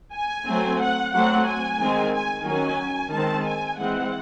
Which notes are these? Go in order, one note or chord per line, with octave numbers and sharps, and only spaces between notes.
G#5
F#3 A3 C4
F#5
F#3 A3 C4 F#5
G#5
D#3 G#3 C4
G#5
D#3 F#3 C#4 G#5
D#3 G#3 C4 A5
G#5
E3 G#3 C4 F#5